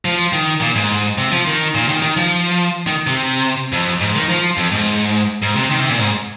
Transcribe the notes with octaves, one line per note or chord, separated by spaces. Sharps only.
F3
D#3
A#2
G#2
C3
F3
D#3
A#2
D#3
D#3
F3
D#3
C3
F2
G#2
D#3
F3
F2
G#2
G#2
C3
D#3
C3
A#2
G#2